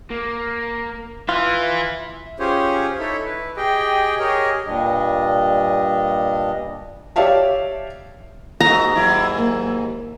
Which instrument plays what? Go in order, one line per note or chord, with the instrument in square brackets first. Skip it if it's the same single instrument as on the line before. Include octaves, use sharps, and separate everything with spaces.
[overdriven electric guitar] A#3
[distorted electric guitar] E3 [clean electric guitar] F4 [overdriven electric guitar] E5
[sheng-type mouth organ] C#4 F4 G4 G#4 C5 C#5
D#4 E4 A4 C#5 E5
E4 B4
G4 G#4 D#5 G5
G4 G#4 A#4 C#5 D#5
[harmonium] G2 A#2 G3 D4 D#5
[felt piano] G4 C#5 D5 E5 F5 A5
[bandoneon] D#2 G#2 [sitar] F#4 D#5 E5 [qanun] A#5
[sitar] E3 F#3 E4
[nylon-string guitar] A#3